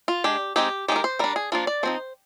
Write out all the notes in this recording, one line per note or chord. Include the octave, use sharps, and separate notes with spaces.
F4
G#3 D4 G4
G#3 C4 D#4 G4
D#3 G#3 D#4 G4
A#4
C5
G3 D4 A#4
G#4
F3 A#3 D4 F4
D5
F3 C4 D#4 C5